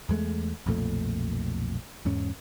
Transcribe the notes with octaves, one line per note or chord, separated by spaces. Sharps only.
E2 G#3 A3
B1 F2 A#2 A3
E2 G#2 C#4